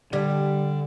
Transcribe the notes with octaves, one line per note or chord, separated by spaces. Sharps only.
D3 G3